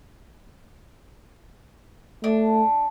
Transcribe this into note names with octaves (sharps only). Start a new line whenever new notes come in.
A3 D4